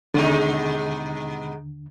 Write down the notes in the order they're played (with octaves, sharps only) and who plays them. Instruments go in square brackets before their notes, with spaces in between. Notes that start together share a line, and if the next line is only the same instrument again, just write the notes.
[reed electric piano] D#2 D3 [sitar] B2 G#3 D#4